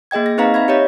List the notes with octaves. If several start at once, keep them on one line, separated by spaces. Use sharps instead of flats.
A#3 G#4 D#5 G5 G#6
A#6
C4 D#4 B4 D#5 F5 A#5
E5 B5 G#6
G4 C#5 D#5